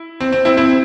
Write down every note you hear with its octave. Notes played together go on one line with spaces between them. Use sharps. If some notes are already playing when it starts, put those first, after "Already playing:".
Already playing: E4
C4
C4
C4 E4
C4 E4